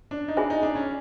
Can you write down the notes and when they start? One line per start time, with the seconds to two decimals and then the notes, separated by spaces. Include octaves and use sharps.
0.11 D4
0.28 D#4
0.37 D4 F4 G#4 C5 E5 G#5
0.50 D#4
0.63 D4
0.75 C#4